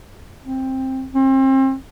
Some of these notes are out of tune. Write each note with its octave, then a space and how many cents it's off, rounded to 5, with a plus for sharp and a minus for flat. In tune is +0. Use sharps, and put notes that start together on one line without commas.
C4 +10
C4 +35